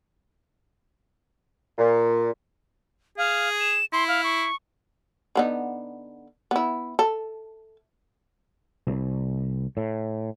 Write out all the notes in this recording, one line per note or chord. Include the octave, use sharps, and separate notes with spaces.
A#2
G#4 F5
E7
E4 C6
F5
C#6
D3 B3 D#4
B3 E4
A4
C2
A2